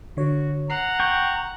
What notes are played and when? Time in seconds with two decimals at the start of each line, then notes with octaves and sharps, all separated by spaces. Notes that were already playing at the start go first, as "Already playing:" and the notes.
0.17 D3 F#4 C#5
0.70 F#5 A#5 C7
1.00 G5 C#6